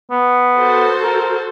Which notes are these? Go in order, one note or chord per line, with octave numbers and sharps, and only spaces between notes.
B3
F#4 A4 C5
A#4